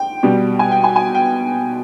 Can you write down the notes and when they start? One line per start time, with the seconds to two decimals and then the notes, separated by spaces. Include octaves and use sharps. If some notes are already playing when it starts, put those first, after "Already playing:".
Already playing: G5
0.23 B2 G3
0.59 G#5
0.71 G5
0.84 G#5
0.96 G#5
1.15 G5